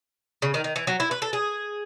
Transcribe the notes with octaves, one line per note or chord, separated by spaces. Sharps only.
C#3
D#3
D#3
E3
F#3
E4
B4
A4
G#4